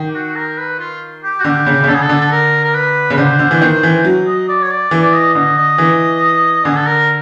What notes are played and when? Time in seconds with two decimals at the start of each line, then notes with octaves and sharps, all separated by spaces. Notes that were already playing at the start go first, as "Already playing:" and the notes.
Already playing: D#3
0.08 G4
0.14 F#4
0.35 A#4
0.58 B4
0.79 F4
1.23 G4
1.40 F#4
1.44 D3 G4
1.66 C#3
1.83 C#3
1.88 D3 A4
1.95 G#4
2.02 A4
2.09 D3
2.21 A4
2.31 A#4
2.63 A#4
2.74 B4
3.10 C#3
3.13 B4
3.17 D3 C5
3.39 D3
3.51 E3
3.62 D#3
3.83 E3
4.05 F#3
4.27 D#5
4.48 D5
4.62 C#5
4.70 D5
4.91 E3
5.01 D5
5.13 D#5
5.34 D3 D#5
5.57 D#5
5.78 E3
6.65 D3 G#4
6.76 A4
6.86 A#4